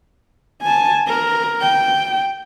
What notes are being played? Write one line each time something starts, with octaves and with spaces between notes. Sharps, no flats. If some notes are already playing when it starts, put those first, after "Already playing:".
G#5 A5
A#4
G5